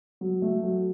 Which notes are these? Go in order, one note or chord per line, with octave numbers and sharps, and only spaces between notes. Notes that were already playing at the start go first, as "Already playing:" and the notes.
F#3
A3
F#3